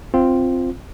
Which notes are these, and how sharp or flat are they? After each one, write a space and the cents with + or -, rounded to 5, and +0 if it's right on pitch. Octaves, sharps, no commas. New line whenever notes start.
C4 +0 F4 +0